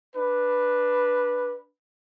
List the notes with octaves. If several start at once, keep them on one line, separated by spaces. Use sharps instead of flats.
D4 B4